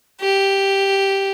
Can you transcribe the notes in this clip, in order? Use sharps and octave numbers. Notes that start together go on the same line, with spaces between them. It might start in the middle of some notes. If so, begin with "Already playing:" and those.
G4